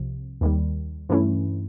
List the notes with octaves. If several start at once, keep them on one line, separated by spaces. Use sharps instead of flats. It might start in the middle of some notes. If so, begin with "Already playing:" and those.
Already playing: C2 C3 F3
D#2 D#3 G3
G2 E3 A3 C#4 E4